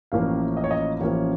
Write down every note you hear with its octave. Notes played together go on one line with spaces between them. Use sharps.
A1 A2 F3 A#3 C#4 F5
D#5
C#5
D#5
A1 A2 F3 A#3 C#4 C#5